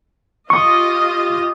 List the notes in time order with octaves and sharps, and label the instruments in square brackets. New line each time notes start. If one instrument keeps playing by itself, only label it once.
[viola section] F4 G4 D#5 [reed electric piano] C#6